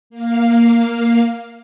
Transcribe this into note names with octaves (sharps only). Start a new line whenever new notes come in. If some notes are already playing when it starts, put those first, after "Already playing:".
A#3 F5